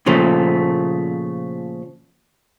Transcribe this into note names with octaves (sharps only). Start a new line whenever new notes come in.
A#2 C#3 F3 A3